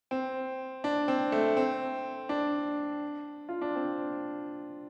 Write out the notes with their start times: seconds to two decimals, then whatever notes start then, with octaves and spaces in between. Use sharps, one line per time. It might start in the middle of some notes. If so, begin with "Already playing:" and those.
0.11 C4
0.84 D4
1.08 C4
1.32 A3
1.57 C4
2.29 D4
3.49 F4
3.62 D4
3.75 C4